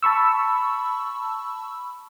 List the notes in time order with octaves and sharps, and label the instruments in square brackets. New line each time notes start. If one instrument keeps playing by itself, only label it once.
[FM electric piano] A5 B5 C#6 E6